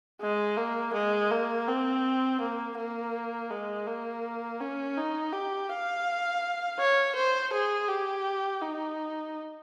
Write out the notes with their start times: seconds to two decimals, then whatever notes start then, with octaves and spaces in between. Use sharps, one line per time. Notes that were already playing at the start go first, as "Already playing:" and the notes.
0.21 G#3
0.57 A#3
0.94 G#3
1.31 A#3
1.68 C4
2.41 A#3
2.77 A#3
3.51 G#3
3.87 A#3
4.60 C#4
4.97 D#4
5.33 G4
5.69 F5
6.79 C#5
7.16 C5
7.53 G#4
7.89 G4
8.62 D#4